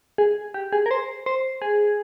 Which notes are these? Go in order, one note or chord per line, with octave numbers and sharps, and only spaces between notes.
G#4
G4
G#4
A#4
C5
C5
G#4